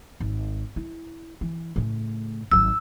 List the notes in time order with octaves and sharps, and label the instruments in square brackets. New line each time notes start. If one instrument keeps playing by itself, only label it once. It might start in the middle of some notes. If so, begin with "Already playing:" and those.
[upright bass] G#1
E4
E3
A2 C#3
[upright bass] G#1 F#3 [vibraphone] E6